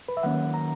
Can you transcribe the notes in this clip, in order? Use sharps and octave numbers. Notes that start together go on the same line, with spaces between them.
B4
E5
D#3 F#3 A#3 C#4 F#5
A#5